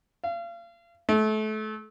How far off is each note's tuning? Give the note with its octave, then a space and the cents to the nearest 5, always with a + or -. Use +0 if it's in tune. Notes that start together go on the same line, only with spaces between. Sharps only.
F5 -35
A3 -30